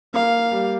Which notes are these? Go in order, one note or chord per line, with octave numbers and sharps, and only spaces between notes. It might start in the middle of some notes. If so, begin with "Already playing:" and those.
A#3 F5
G3